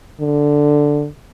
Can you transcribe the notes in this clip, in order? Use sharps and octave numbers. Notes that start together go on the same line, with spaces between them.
D3